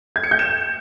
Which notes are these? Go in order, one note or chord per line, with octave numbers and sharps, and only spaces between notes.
G#6
C#7
G6
E7